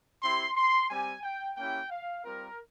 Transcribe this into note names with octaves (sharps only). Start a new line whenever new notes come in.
C4 E4 G4 C6
C6
G3 C4 G4 G#5
G5
A#3 C#4 E4 G4 G5
F5
G3 C4 F4 A#4